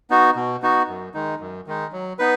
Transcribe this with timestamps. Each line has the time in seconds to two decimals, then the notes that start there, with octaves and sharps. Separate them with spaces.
0.10 B3 D#4 F#4
0.36 B2
0.62 B3 D#4 F#4
0.88 F#2
1.14 D#3 G#3 D#4
1.40 F#2
1.67 D#3 G#3 D#4
1.92 F#3
2.19 B3 D#4 B4